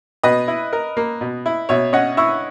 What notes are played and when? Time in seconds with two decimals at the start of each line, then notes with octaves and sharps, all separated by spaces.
0.23 B2 B4 D#5
0.48 E4
0.73 A#4
0.97 A#3
1.21 B2
1.46 E4
1.69 B2 C#5 E5
1.93 C#4 D#5 F#5
2.17 E4 C#6 E6